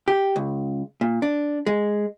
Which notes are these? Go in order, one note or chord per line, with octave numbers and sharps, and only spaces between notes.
G4
C#2
A#2
D4
G#3